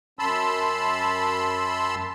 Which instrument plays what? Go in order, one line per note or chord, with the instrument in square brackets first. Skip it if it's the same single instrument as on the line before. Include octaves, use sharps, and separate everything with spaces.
[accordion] F#2 A5 B5 C6 E6